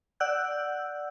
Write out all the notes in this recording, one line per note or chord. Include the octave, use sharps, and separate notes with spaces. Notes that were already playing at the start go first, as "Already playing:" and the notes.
D5 F#5 E6 F#6 G6